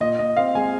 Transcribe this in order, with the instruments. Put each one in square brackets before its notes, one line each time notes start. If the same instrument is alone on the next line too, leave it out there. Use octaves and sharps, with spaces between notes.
[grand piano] A#2 D#5
A#2 D#5
C4 F5
G#3 G#5